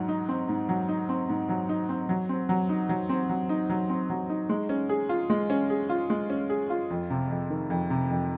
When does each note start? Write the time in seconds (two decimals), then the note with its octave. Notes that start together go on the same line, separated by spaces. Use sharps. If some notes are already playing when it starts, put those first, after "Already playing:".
Already playing: G#2 F#3
0.08 D#4
0.29 C4
0.49 G#2
0.69 F#3
0.89 D#4
1.09 C4
1.29 G#2
1.49 F#3
1.69 D#4
1.89 C4
2.09 F#3
2.29 C4
2.49 F#3
2.69 D#4
2.89 F#3
3.09 C4
3.29 F#3
3.49 D#4
3.69 F#3
3.90 C4
4.10 F#3
4.30 D#4
4.49 G#3
4.69 C#4
4.89 G#4
5.09 F4
5.30 G#3
5.50 C#4
5.70 G#4
5.89 F4
6.10 G#3
6.30 C#4
6.50 G#4
6.70 F4
6.90 F2
7.10 C3
7.30 F2
7.50 D#3
7.70 F2
7.90 C3
8.10 F2